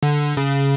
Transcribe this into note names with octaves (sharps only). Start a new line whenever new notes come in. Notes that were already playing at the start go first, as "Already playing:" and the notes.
D3
C#3